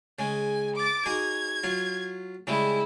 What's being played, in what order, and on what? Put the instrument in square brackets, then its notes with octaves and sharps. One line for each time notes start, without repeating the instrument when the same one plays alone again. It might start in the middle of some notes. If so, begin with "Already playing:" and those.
[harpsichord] C#3 G#3 [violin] G#5
[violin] D6 A6
[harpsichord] D#4 F#4 G#4 [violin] G#6
[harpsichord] F#3 F4
[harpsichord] C#3 G3 G#3 [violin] E4